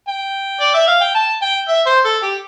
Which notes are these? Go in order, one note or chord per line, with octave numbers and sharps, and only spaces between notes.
G5
D5
E5
F5
G5
A5
G5
E5
C5
A4
G4